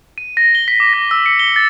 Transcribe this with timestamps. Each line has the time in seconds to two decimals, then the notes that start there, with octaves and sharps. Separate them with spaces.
0.18 D#7
0.37 A#6
0.55 G7
0.68 B6
0.80 D6
0.93 A#6
1.11 E6
1.26 C#7
1.39 G7
1.56 A6